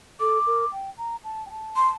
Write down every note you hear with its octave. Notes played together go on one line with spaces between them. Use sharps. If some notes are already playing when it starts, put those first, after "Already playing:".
A4 D6
A#4
G5
A#5
A5
G5
A5
C6